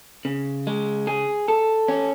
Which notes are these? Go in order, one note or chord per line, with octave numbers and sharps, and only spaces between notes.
C#3
G#3
G#4
A4
C#4